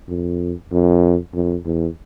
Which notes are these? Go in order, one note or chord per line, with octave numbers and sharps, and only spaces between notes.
F2
F2
F2
E2